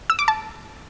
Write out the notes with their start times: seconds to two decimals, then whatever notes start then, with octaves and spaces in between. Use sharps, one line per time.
0.10 E6
0.19 D6
0.28 A5